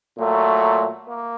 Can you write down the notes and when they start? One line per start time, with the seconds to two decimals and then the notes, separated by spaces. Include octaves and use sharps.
0.19 A#2 F#3 A3
1.06 A#3